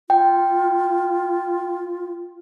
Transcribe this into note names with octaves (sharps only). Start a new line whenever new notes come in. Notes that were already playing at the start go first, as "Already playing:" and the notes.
F4 G5